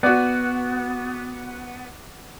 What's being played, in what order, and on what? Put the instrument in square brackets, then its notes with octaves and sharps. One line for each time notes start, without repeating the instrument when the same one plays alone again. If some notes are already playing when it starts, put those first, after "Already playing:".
[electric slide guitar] B3 [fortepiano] F#4 D5